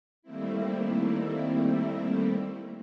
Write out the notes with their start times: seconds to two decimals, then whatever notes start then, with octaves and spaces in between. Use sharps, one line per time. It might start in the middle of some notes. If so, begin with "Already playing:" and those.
0.22 D#3 G3 A3 A#3 C4 E4